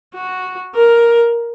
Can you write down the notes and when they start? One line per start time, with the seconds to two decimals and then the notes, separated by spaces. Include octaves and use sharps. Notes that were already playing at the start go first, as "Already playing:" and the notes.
0.15 F#4
0.75 A#4